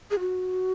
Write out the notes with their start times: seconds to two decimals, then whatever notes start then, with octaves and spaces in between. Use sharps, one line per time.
0.11 G#4
0.19 F#4